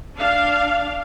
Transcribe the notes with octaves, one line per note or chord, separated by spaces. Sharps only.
D4 F5